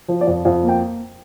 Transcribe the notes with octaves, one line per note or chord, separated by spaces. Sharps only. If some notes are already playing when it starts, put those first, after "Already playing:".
F3
D5
F2
F2 F5
A#3
G5